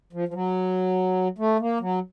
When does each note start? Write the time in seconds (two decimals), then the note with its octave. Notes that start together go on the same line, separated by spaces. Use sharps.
0.13 F3
0.28 F3
0.34 F#3
1.38 A3
1.60 A#3
1.80 F#3